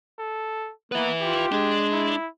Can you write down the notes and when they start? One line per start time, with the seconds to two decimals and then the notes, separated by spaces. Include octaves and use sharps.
0.19 A4
0.92 A#3 B3 B4 E5
1.21 F4 G4
1.52 G#3 D4
1.92 E4